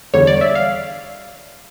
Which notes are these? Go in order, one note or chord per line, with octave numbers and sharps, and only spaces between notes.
E2 D3 G3 C#5
D5
E5
F5